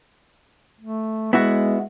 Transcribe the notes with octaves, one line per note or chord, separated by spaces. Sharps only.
A3
G#3 B3 E4 F#4